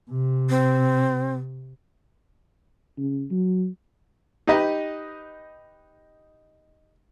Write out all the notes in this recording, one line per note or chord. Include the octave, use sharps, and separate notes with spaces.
C3
C4
C#3
F#3
D#4 G4 B4 D#5